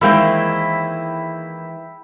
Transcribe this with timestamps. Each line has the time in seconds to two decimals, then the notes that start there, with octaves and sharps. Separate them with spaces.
0.01 D#3 E3 G#3 A#3 C4 E4 E5 G5